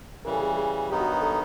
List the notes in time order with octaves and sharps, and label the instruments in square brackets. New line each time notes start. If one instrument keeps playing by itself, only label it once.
[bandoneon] C#3 E3 G3 [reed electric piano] A#4
[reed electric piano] A4
G#4
G#4
[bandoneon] G2 D#3 F#3 B3 D#4 [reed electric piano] G4
[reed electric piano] F#4
A4